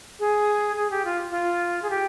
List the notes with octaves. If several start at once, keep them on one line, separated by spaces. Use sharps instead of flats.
G#4
G#4
G4
F4
F4
G#4
G4